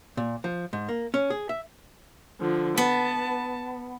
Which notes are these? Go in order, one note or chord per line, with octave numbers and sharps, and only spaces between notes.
A#2
F3
G#2
A#3
C#4
G#4
E5
D3 F3
B3 A5